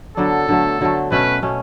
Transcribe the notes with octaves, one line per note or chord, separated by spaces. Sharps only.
D3 F#3 B3 D4 A4
D3 F#3 A3
D3 F#3 A3
B2 A3 C#4 B4
B2 A3 C#4